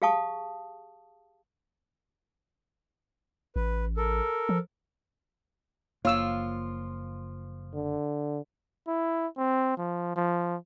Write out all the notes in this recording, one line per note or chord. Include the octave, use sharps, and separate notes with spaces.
G4 G#4 F5 A5 C#6 D#6
A1 B4
A4 A#4
F3
F#1 F3 A#3 F4 C#5 E6
D3
E4
C4
F3
F3